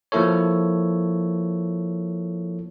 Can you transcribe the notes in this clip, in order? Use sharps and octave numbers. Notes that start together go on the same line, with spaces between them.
F3 A#3 E4 A4 C#5